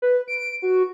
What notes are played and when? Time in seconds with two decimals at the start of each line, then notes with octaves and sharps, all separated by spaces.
0.02 B4
0.28 D7
0.62 F#4